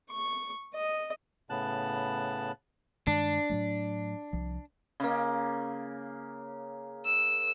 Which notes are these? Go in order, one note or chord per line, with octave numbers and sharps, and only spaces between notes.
C#6
D#5
A2 C#3 B3 A5 F#6
G2 D#3 G#3 D4
A2 F#3 A3
C2 F3
C#3 A#3
E6